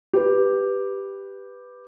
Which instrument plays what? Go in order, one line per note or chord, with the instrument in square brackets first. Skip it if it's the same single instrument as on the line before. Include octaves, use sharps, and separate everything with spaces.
[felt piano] G4 B4